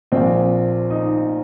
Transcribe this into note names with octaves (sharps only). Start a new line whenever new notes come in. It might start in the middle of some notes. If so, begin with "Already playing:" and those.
A#1 A#2 F3 C4
D#4